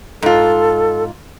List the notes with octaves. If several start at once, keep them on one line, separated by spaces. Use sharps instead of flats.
G#2 F4 A4